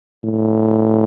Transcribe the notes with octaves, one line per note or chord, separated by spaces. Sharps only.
A2